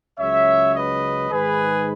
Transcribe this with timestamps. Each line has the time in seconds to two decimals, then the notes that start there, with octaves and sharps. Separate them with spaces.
0.18 C#2 C#3 F#3 C#5 E5
0.75 B4 D#5
1.32 G#2 D#3 G#3 G#4 B4